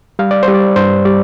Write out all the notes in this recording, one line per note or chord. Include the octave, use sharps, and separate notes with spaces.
G3 F5
D5
C5
G3
D5
G2 C5
G3 D5